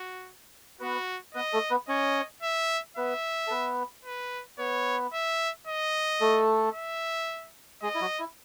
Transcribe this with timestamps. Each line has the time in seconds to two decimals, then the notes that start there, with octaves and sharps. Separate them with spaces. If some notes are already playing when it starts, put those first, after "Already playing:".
Already playing: F#4
0.80 B3 F#4 B4
1.34 B3 B4 D#5
1.53 A3 A4
1.70 B3 B4
1.88 C#4 C#5 D#5
2.42 E5
2.97 B3 B4 E5
3.47 A4
3.51 B3 B4
4.05 B4
4.58 B3 B4 C#5
5.13 E5
5.67 D#5
6.20 A3 A4
6.75 E5
7.82 G#3 G#4 D#5
7.95 E4
8.01 F#3 F#4
8.19 E4